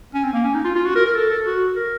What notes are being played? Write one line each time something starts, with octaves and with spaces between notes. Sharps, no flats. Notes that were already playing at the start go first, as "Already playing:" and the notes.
C#4
C4
A#3
C#4
D#4
F4
F4
F#4
A#4
A#4
A4
A4
F#4
A#4